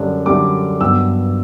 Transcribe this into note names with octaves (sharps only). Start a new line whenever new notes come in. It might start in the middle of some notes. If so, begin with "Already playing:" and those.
Already playing: F#2 D3 G3 D4
F#2 D3 G3 D4 D6
G2 F#3 B3 E6